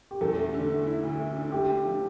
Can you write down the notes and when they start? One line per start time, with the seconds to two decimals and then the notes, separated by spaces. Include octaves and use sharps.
0.11 G4
0.21 E2 A4
0.38 A3
0.54 D3
0.70 A3
0.87 E4
1.03 D2
1.19 A3
1.36 D3
1.52 A3 G4
1.69 A3
1.85 F3